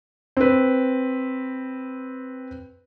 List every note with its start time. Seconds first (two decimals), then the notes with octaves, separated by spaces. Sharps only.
0.37 C4 B4